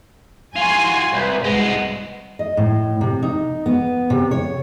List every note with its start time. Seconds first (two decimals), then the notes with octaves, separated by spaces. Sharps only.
0.56 F4 F#4 G#5 C6
1.14 C2 B4
1.44 C2 G#2 G#3 B3
2.39 D#5
2.57 A2
3.01 C3
3.23 D#4
3.66 B3
4.10 C3
4.31 C#5